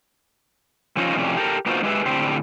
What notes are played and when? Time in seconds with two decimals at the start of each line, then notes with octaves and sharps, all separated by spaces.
0.97 F3 C#4 D#4 F4 C#5 D#5
1.16 F2 A2 C3 C#4 D5
1.37 G4 A4 A#4
1.66 A#3 B3 D#4 F4 F#4 C5
1.83 G#3 G4 G#4 B4 E5
2.06 A2 D3 C4 G4 C5